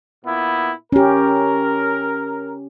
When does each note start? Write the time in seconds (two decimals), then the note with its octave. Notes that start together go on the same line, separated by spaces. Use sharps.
0.24 A#2 B3 E4
0.92 C#4 G4 A#4